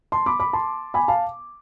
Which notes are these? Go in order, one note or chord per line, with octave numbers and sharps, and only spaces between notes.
A5 C6
B5 D6
B5 D6
A5 C6
G#5 B5
F5 A5